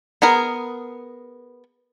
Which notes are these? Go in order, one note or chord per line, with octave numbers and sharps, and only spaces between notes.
B3 G#4 A#4